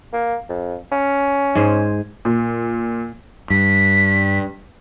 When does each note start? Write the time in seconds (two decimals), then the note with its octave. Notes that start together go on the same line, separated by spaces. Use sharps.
0.13 A#3
0.49 F2
0.92 C#4
1.55 G#2 G#4 C5
2.25 A#2
3.50 G2 B6